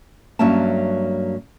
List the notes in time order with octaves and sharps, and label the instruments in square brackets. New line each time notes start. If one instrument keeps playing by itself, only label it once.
[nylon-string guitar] G2 F#3 A#3 C#4 E5 A5